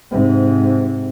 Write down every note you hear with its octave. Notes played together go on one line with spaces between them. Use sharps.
G#2 C3